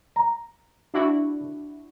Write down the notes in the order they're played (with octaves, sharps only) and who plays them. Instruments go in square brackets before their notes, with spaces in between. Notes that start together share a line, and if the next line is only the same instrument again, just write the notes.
[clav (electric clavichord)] A#5
[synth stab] D4 E4 F#4